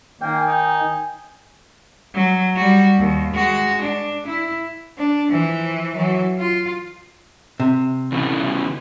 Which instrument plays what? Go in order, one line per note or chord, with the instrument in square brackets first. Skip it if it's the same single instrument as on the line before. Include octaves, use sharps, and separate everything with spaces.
[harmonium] D#3 [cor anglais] A#3 [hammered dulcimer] G5 G#5
[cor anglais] D#4
[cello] F#3
G3 F#4
D#2
G#3 F#4
D4
E4
D4
E3 F3
E3 F#3
F4
[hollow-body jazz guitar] C3
[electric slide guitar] E2 C#3 E3